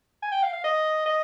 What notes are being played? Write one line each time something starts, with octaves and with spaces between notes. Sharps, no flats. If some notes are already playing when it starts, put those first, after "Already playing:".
G#5
G5
F5
F5
D#5
D#5